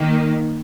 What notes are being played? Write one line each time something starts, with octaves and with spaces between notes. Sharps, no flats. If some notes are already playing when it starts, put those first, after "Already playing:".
Already playing: D#3 A#3